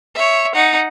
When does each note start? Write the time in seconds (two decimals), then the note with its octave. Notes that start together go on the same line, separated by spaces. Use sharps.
0.15 C#5 E5
0.55 D#4 F#5